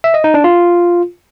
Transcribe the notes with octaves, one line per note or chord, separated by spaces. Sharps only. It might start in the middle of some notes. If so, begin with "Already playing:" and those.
E5
D#5
D#4
D4
F4